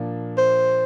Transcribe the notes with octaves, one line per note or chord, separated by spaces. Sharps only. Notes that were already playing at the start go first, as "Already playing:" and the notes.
Already playing: A#2 F3 A#3 D4
C5